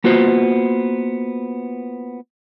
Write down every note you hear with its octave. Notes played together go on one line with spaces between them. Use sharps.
A#3 B3 F4 F#4 C5